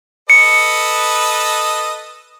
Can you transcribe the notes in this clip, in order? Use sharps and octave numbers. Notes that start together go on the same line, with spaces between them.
A4 B4 D#5 C#7